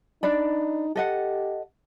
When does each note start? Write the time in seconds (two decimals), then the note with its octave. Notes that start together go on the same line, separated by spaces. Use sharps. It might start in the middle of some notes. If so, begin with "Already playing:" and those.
0.23 D4 D#4 D5 B5
0.96 G4 A4 D#5 F#5